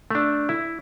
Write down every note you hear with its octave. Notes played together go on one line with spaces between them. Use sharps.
A3 D4
E4